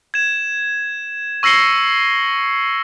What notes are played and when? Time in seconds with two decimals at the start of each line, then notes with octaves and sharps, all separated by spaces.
0.14 G#6 E7
1.43 C#6 E6 A#6 C7 C#7 G7